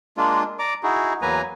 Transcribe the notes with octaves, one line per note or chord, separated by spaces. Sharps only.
G#3 A#3 D4 F4
D5 A#5 D6
D#4 E4 F#4 G#4
E2 F#3 A#3 B4 G#5 A#5